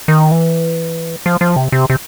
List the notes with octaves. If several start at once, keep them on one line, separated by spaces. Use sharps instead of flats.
D#3
E3
F3
F3
C3
C3
C3